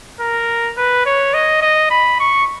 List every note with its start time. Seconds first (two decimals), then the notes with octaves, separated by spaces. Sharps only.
0.21 A#4
0.77 B4
1.06 C#5
1.34 D#5
1.62 D#5
1.91 B5
2.20 C#6